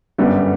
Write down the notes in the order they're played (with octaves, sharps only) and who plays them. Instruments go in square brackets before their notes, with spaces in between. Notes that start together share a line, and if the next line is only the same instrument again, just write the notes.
[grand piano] G1 F#2 D3 G3 B3